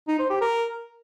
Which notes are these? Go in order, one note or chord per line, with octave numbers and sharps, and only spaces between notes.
D#4
C5
G4
A#4